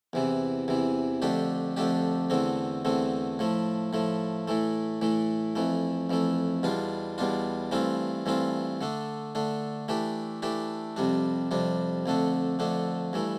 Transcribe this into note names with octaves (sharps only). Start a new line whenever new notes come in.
E2 C3 E3
E2 C3 E3
F2 D3 A3 D4 G4
F2 D3 A3 D4 G4
E2 D3 A3 C4
E2 D3 A3 C4
A2 F3 A3
A2 F3 A3
A2 E3 A3
A2 E3 A3
F2 E3 A3
F2 E3 A3
E2 B2 G3 D4 F4
E2 B2 G3 D4 F4
G2 E3 A3 C4 F4
G2 E3 A3 C4 F4
D3 A3 D4
D3 A3 D4
E3 A3 D4 G4
E3 A3 D4 G4
F2 C3 G3 D4
F2 C3 G3 D4
F2 D3 A3 D4
F2 D3 A3 D4
G2 E3 A3